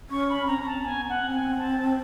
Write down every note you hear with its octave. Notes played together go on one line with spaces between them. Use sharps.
C#4 C#6
B5
C4 A#5
C#4
C4 A5
B3 G#5
F#5
C4
G#5
A5